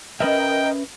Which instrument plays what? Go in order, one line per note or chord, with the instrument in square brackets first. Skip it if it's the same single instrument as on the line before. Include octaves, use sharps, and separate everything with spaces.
[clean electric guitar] C#4 B4 E5 [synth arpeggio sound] A#4 D#5 [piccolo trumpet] G5